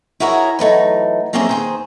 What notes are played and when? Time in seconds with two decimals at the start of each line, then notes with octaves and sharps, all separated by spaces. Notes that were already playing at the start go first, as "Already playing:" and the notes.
0.20 E4 F#4 G#4 A#4 C#5 E5
0.59 E3 F#3 A3 D#4
1.33 F#3 A#3 C4 C#4 G#4 E5
1.49 D#2 G#4 C5